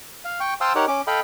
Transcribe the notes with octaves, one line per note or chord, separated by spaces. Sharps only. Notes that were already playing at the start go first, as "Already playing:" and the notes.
F5
G5 C#6
C5 F5 G5 A5 D#6 E6
D#4 G4 A#4 C#5 F#5
C#4 D6
A4 D#5 F5 G5 B5